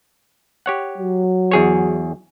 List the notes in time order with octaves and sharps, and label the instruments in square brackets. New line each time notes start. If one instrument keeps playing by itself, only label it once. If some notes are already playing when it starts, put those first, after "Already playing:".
[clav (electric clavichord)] G4 C#5 F#5
[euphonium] F#3
[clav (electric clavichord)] E2 G#4 C#5